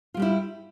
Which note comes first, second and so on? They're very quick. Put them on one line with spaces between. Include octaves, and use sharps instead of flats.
F4 G3 G4 E4